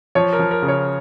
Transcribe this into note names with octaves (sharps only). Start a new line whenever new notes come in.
F3 C#5
A#4
F3
A#4
C#3
C#5